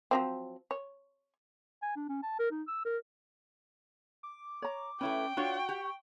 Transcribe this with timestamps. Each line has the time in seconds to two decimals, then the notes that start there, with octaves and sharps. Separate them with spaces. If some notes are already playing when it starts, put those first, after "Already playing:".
0.11 F3 F#3 C4
0.71 C#5
1.82 G#5
1.96 D4
2.09 C#4
2.23 A5
2.39 A#4
2.51 D#4
2.68 E6
2.85 A#4
4.23 D6
4.62 C#5 A#5
5.01 A3 C#4 E4 B4 G5
5.37 D4 F4 F#4 C#5 C#6
5.69 G4 C#6